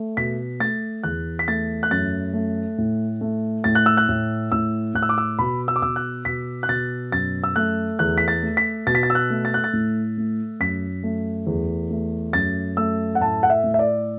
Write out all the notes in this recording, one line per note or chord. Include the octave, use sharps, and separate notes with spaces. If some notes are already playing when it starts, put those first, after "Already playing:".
Already playing: A3
B2 B6
A3 A6
E2 F#6
B6
A3 A6
F#6
F#2 A6
A3
A2
A3
A2 A6
F#6
E6
F#6
A2
A2 E6
A2 F#6
E6
D6
E6
B2 B5
E6
D6
B2 E6
F#6
B2 B6
F#6
B2 A6
F#2 A6
E6
A3 F#6
E2 F#6
B6
A6
A3
B6
B2 A6
B6
A6
E6
F#6
A3
A6
F#6
A6
A2
A3
F#2 B6
A3
E2
A3
F#2 A6
A3 E6
F#5
A2 A5
F#5
E5
A2
E5
D5